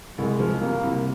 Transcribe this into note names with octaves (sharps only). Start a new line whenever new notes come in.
C2 G#3
F3
C3 A#3
C2